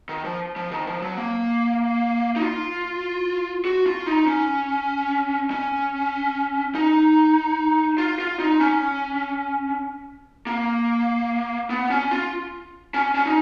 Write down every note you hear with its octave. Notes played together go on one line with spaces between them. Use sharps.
D#3
F3
F3
D#3
F3
F#3
A#3
D#4
F4
F#4
F4
D#4
C#4
C#4
D#4
F4
F4
D#4
C#4
A#3
B3
C#4
F4
C#4
C#4
D#4